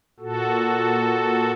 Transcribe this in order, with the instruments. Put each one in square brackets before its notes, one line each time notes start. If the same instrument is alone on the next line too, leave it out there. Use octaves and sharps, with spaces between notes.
[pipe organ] A#2 F#4 A4